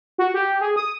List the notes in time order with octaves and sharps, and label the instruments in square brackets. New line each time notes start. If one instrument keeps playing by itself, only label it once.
[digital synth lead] F#4
G4
G#4
D#6